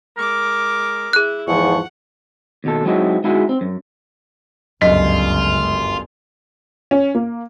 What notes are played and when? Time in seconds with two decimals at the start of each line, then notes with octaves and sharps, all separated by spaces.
0.17 G#3 A#4 D6
1.13 E4 G#4 F#6
1.48 E2 G#2 F3 F#5 C#6
2.64 D#2 B2 A4
2.85 F#3 G#3 C4 D#4 E4 F#4
3.24 G#3 D#4 E4 F#4 G#4
3.49 C4
3.61 F#2
4.82 G1 C#2 F#2 F4 D#5
6.91 C#4
7.15 A#3